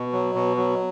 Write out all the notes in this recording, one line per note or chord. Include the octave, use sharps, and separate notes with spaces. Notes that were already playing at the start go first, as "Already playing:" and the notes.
Already playing: B2
F#3
B2
F#3